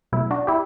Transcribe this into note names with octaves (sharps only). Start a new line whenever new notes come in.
B2 F#3 A3 E4
D4 F#4
E4 G4